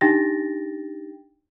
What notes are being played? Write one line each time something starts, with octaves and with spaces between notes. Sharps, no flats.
D4 D#4 G4 G5 A6 A#6